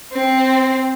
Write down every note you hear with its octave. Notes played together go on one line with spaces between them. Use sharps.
C4